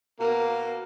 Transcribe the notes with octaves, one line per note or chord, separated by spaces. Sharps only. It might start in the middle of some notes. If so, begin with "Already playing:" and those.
B2 A#3